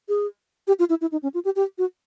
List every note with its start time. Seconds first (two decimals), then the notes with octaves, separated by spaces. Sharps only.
0.09 G#4
0.68 G4
0.79 F4
0.90 E4
1.01 E4
1.12 D#4
1.23 C#4
1.34 F4
1.45 G4
1.56 G4
1.78 F#4